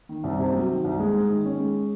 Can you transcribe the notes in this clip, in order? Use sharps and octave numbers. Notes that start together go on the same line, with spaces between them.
D#3
C2
C3
F#3
D#3
C2
G#3
G#2
D#3
C#4
G#3